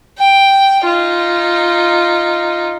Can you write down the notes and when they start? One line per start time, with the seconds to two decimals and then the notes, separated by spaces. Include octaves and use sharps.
0.19 G5
0.84 D#4 F4